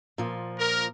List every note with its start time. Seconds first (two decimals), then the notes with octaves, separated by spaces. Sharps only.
0.18 A#2 F3
0.59 A#4